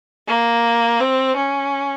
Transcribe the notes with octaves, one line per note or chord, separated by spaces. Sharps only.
A#3
C4
C#4